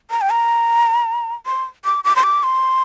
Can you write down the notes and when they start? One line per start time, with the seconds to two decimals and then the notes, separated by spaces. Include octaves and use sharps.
0.11 A#5
0.21 G5
0.30 A#5
1.46 C6
1.85 D6
2.04 D6
2.16 C6
2.23 D6
2.43 C6